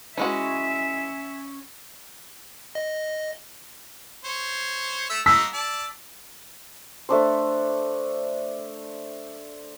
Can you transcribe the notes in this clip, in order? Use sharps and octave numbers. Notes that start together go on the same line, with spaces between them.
E3 G#3 C#4 F#4 E5
D#5
C5 C#5
A3 E5 E6
A#3 D#4 F#4 E6 B6
D5 A5
A3 D4 C5